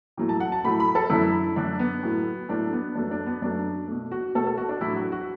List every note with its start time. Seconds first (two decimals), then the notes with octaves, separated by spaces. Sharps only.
0.17 A2 F#3 A3
0.29 A5
0.40 F#5
0.52 A5
0.64 A2 F#3 A3 B5
0.80 B5
0.95 A4
1.10 F#2 D3 A3 E4
1.56 F#2 D3 A3 D4
1.79 B3
2.03 A2 F#3 A3
2.49 A2 F#3 A3 D4
2.73 B3
2.95 F#2 F#3 A3 D4
3.11 D4
3.26 B3
3.42 F#2 F#3 A3 D4
3.88 B2 A3
4.12 F#4
4.35 B2 A3 A4
4.47 A4
4.58 F#4
4.69 D4
4.81 A2 F#3 A3 E4
4.96 F#4
5.12 F#4